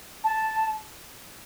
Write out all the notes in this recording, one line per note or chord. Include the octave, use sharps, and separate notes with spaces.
A5